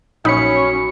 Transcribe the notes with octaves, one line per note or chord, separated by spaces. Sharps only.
A#1 F#2 C#4 D#4 B5 C#7